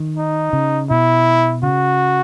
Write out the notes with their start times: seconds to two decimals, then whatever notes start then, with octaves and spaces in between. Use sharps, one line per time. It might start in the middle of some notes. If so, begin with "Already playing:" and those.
Already playing: D#3
0.17 D#4
0.53 C#3
0.90 B2 E4
1.63 C#3 F#4